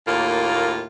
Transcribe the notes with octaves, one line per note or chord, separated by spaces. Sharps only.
D#2 A2 A#3 F4